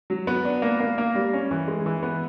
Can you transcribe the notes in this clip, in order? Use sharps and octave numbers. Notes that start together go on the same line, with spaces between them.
F#3
B3
D4
A#3
A#3
A#3
G3
C#4
E3
G#3
E3
B3